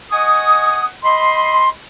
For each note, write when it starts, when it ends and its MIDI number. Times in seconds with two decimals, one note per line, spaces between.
0.12 0.86 75
0.12 0.86 78
0.12 0.86 80
0.12 0.86 85
0.12 0.86 87
1.04 1.69 75
1.04 1.69 83
1.04 1.69 84